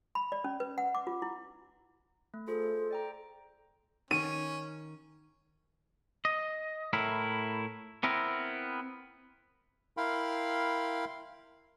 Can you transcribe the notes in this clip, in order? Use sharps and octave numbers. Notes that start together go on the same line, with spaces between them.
B5
D5
C#4
B4
F#5
D6
F4
E4
A3
F4 G#4 A4 C5
D5 G5 A#5
D#3 C#4 D#7
D#5
A2 E4 A#4
B3 C4 E4 A#4
E4 A#4 F5 G5 B5 C6